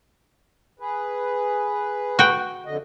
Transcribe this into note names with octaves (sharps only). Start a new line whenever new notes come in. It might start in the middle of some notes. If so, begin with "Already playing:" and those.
G#4 B4
F#4 G5
F2 D3 D#5